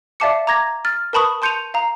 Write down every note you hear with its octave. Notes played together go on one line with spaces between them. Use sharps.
D5 E5 F5 A5 D6 C#7
A#5 D6 G#6 A#6
F6 A6
A#4 B4 A5 B5 C#6 D#6
A5 C6 G6 C#7 D#7 F7
F5 A#5